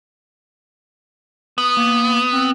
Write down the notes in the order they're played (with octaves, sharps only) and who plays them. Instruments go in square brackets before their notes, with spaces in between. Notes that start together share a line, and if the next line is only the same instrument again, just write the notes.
[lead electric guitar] B3 [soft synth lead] D#6
[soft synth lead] A#3
C4